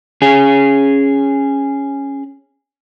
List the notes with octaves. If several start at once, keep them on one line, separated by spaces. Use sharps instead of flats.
C#4 G#4